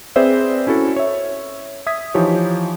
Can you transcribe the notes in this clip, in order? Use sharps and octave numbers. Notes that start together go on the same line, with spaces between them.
C4 G#4 B4 C5 D5 E5
C#4 E4 F#4 A4
C#5 E5
E5 D#6 G#6 B6
E3 F3 D#4 G4 C#5